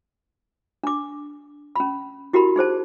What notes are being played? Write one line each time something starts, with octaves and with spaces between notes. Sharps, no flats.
D4 D6
C#4 B5
E4 F#4 G4 A#4 B5
D#4 G#4 C5 A5